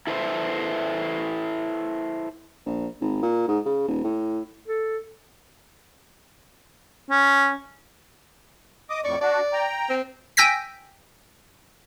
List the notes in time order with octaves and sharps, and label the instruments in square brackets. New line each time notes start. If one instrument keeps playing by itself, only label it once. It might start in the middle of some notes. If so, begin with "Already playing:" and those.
[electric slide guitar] E4 A4 B4 C5 E5
[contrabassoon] A#1
G#1
A#2
G#2
C#3
D#1
A2
[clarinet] A4
[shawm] C#4
[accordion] D#5 D6 D#6
[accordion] F2 A2 C#6 [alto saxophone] D5
[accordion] D4 F#4 [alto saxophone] D5
[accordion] G5 A#5
[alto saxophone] C4
[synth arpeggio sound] G5 G#5 E6 G6 A#6 B6